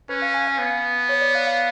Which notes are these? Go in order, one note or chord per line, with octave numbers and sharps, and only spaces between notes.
C#4 B4
F5
G#5
F5
B3
C#5
D5
F5
F5